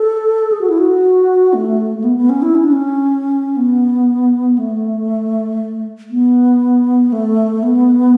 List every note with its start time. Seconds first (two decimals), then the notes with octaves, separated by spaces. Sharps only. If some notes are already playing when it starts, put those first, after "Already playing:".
Already playing: A4
0.52 G#4
0.61 F#4
0.70 E4
0.78 F#4
1.54 A3
1.98 A3
2.04 B3
2.17 B3
2.29 C#4
2.42 E4
2.55 C#4
2.64 D4
2.72 C#4
3.57 B3
4.58 A3
6.11 B3
7.13 A3
7.63 B3